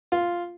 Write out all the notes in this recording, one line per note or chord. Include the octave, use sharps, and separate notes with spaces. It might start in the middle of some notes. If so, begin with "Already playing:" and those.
F4